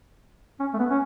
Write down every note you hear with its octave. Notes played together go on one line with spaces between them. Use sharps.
C#4
A3
B3
C#4